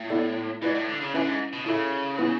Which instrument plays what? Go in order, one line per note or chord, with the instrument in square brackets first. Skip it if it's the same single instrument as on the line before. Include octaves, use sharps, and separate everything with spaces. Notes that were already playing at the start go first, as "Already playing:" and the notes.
Already playing: [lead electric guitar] A2
[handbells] B3 E4 A4 D5
[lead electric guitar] G#2 [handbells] E4 B4 D5
[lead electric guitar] A2
D3
C#3
[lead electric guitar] D3 [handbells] C#4 E4 B4 E5 G#5
[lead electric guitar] G#2
B2
[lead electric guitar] C#3 [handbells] E4 A4 E5
[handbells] B3 E4 B4